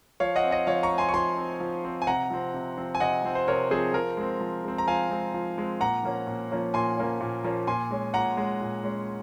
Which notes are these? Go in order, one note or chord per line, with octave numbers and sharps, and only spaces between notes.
F3 C#5 F5
D#5 F#5
C4
D#5 F#5
F3 C#5 F5
A#5 C#6
C4
G#5 C6
C#6
F3 G#5 C6
C4
F3
C4
G#5
C3 F#5 A#5
F3 C4
C3
F3 C4
G#5
C3 D#5 F#5
F3 C4
C5
C3 A#4 C#5
F3 C4 G#4 C5
F3 A#4
G#3 C4
F3
G#3 C4
A#5
F3 F5 G#5
G#3 C4
F3
G#3 C4
A#2 F#5 A#5
F3 A#3 C#4
A#2
F3 A#3 C#4
A#2 G#5 C6
F3 A#3 C#4
A#2
F3 A#3 C#4
A#2 G#5 C6
G#3 C#4
A#2 F#5 A#5
G#3 C#4
A#2
G#3 C#4